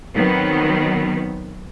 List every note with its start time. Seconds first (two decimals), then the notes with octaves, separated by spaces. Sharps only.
0.14 D#3 F#3 B3 C4